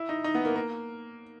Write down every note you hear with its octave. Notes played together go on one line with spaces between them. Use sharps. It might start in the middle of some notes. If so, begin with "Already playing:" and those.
Already playing: E4
D#4
D#4
B3
A#3
A#3